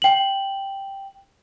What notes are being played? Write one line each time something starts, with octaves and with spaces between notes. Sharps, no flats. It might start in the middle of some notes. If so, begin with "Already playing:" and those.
G5 F#7